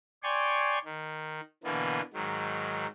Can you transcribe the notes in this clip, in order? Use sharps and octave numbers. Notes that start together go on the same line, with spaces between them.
C#5 D5 G5 G#5 C6 C#6
D#3
B2 D3 E3 A#3 B3
G#2 D#3 F#3